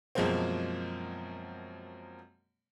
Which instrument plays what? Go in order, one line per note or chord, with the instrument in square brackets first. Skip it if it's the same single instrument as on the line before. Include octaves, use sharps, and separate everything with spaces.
[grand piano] F#2 B2 F3 G#3 A#3 C4